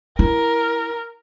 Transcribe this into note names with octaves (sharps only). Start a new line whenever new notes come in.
E4 A#4